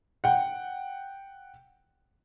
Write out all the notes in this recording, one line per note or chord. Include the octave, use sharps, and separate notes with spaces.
F#5 G5